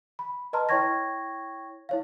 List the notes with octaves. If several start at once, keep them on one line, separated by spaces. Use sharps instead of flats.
B5
B4 D#5 A5 A#5 C6 F6
E4 C#5 G5 C#6 G#6 A#6
E4 C#5 F5